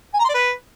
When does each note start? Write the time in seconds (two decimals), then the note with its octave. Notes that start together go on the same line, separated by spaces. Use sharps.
0.14 G#5
0.19 A#5
0.24 C6
0.29 D5
0.34 B4